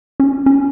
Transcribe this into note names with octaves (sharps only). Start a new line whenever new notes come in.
C#4
C#4